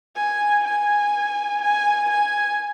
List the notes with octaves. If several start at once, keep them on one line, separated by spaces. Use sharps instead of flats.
G#5
G#5
G#5
G#5